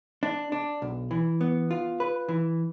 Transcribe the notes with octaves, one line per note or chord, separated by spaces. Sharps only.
D4
D4
B1
E3
B3
F4
B4
E3